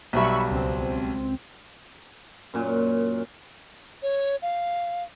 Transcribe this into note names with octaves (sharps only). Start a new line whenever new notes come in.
B1 G3 E5 B5 C#6
C#2 C4
F#2 A#2
C#5
F5